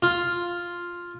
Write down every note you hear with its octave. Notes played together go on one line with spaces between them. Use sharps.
F4